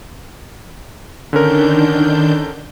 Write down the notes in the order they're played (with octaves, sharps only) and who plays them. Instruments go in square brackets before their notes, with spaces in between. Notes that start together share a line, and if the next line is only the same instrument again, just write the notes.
[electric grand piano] D3 C#4 A#4 [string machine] D#3 D4 G6